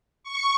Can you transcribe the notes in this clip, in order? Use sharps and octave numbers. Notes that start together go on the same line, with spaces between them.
C#6